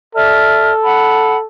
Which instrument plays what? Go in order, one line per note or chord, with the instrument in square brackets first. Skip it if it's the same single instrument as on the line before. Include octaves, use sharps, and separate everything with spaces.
[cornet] A4 [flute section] D5 E5 F6
[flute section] F#5 B5